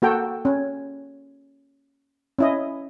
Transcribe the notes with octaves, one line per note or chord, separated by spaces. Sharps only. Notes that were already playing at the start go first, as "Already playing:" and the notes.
A#3 F#4 A4 G5
C#4
C#4 E4 D#5